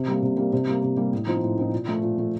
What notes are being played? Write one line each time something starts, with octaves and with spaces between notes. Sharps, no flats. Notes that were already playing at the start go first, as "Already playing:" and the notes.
Already playing: C3
G3 A#3
C3
G3 A#3
C3
G3 A#3
C3
G3 A#3
A2
F3 C4 D#4
A2
F3 C4 D#4
A#2
F3 A3
A#2
F3 A3